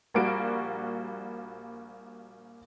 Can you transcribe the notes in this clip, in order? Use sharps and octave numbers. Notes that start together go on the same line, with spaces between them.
A#1 G3 A#3 F#4 D7